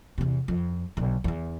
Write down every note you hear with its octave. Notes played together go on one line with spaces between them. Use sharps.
E2 C3
F2
B1 D3
E2 E3